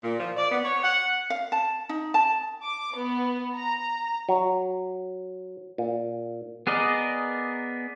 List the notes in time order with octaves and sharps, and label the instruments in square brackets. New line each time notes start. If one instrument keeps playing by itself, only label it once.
[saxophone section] A#2
F3
D5
B3
C#5
F#5
[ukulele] F5
A5
D#4
A5
[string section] D6
B3
A#5
[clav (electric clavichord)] F#3
A#2
[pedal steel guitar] B3 G#4 A#4 D5 D#5